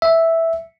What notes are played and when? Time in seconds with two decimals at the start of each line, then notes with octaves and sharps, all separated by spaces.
0.02 E5